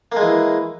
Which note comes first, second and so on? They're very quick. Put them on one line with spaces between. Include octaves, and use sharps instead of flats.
A#3 G#3 E3